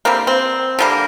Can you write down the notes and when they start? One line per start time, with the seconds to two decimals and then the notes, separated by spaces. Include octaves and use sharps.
0.05 D3 G3 A#3 C4
0.27 C4
0.79 D3 G3 A#3